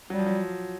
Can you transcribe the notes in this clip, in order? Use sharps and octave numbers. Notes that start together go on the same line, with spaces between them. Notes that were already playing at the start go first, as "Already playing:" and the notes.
F#3 G3
F3
F#3